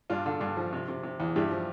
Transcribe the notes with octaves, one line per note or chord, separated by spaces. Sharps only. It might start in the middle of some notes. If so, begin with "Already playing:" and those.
G2 D4 F4
D3
G2
F3
C3
C3
C3
E2
G2 E4 G4
F3